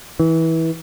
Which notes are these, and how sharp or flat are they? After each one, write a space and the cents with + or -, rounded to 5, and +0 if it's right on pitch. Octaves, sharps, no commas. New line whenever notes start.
E3 -20